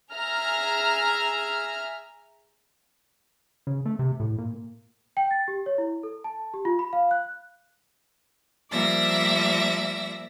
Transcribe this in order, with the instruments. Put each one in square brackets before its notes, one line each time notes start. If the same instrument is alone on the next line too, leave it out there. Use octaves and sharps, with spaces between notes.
[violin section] G#4 E5 A#5 F6
[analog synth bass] C#3
A3
C3
A2
A#2
[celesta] G5
A6
G4
C#5
E4
A4
A5
G4
F4
B5
F5
F#6
[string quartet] F3 G3 A#3 D5 E5 A#6